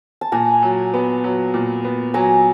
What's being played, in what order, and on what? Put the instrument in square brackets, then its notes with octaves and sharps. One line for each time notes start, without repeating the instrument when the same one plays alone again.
[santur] A5
[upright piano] A#2 [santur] G#5 A#5
[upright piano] F#3
B3
F#3
A#2
B3
[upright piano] F#3 [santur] G#5 A#5